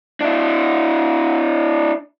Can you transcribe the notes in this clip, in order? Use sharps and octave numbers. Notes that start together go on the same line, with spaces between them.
D4 E4